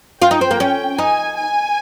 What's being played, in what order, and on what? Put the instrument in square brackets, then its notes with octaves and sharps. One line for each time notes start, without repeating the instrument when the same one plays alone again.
[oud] F4 [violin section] G5
[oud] D#4
C4
A#3
C#4
[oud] D#4 [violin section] G#5
[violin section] G#5